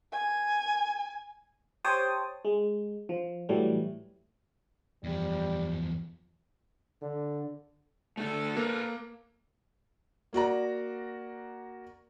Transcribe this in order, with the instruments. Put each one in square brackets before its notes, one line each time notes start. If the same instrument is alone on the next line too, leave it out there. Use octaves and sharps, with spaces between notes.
[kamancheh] G#5
[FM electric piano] G4 C5 C#5 G5 A5 D#6
G#3
F3
A2 E3 F#3 G3 A3
[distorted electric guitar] E2 F3 [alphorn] G3
[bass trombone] D3
[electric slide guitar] D3 A3 [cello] A4
[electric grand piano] A#3 [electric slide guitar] A#4 B4
[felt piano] A#3 F#4 D5 A#5